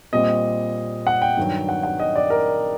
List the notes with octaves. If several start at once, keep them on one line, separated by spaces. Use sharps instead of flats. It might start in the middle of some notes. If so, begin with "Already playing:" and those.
A#2 G3 C4 D#5
F#5
G5
G2 D#3 F#3
F#5
F#5
D#5
D5
A#4